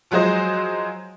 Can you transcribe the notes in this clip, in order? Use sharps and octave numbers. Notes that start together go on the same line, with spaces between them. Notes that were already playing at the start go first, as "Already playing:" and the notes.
F3 F#3 G#3 G#4 C5 D#5